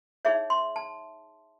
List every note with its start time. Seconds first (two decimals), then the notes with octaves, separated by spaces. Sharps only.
0.25 D#4 G#4 C#5 E5
0.50 C6
0.76 A5